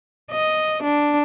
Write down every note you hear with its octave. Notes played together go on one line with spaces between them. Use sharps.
D#5
D4